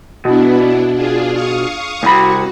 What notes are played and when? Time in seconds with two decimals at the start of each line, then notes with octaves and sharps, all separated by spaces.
0.25 B2 B3 D4 E4
0.92 D4 F4 G#4
1.30 F5 C#6 D#6
2.03 C2 F#4 B5